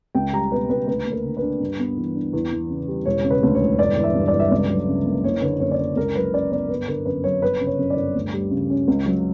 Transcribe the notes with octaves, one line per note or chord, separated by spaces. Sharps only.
C#2 G5
G3 A#5
B2 B4
C#2 B4
D2 B4
A#3
A#4
D3
B4
D4
G2
B3
E3
D4
E2
E3
C#3
G3
E1 C#5
C#3
B4
D2
C#5
E1
G1 D5
E3
E5
G2
D5
G1
E5
C#2 D5
F#3
C#3
A#3
F#1 C#5
D3 B4
F#2 C#5
D5
F#1 C#5
C#2 A#4
F#3 B4
C#3 D5
B3 D5
G1 B4
D3 A#4
F#2 B4
F#3 C#5
G1 B4
C#3
C#5
F#2
D5
G1
D2
G3
C#3
C#4
C#2
F#3